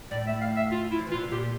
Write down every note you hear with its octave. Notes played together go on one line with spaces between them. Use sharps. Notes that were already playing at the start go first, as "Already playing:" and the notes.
A2 D5
E5
F5
E5
F4
E4
F3
E3
F4
D3
C3
A#2 G4